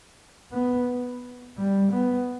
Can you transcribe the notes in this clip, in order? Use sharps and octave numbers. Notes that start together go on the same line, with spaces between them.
B3
G3
B3